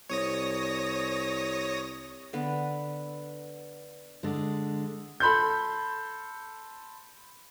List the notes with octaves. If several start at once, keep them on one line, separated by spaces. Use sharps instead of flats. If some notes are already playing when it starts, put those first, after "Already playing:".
C2 C#5 D#6 A#6
D3 B3
D3 G#3
A4 B5 C6 G6